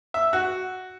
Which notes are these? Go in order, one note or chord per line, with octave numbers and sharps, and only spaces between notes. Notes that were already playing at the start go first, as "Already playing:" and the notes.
E5
F#4